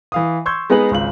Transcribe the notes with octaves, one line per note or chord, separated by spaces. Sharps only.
E3 F5 D#6
C6 C#6 E6 G6 G#6
G#3 B3 D#4 G#4 B4 F#7
G#1 C#2 F#7